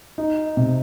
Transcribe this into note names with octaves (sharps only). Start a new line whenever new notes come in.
D#4
C3